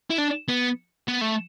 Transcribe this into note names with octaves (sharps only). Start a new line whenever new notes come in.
E4
D4
B3
B3
A3